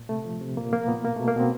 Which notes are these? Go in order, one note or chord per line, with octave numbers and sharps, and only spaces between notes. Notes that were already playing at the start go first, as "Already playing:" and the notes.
Already playing: A#2
C3 A3
F3
C3
A#2 A#3
F3 A#3
A#2 B3
B2 A#3
B2 A3
A#3
B2 C4